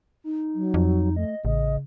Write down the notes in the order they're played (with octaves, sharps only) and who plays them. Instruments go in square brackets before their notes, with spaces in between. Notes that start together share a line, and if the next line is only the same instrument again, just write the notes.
[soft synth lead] D#4
[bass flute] F#3
[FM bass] F2
[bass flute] A3 [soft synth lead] D#5
[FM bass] A1 [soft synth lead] C#3 [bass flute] D#5